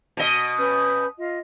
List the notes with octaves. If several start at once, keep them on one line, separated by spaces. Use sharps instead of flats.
B2 D#5
C#4 B4 G6
F4 D#5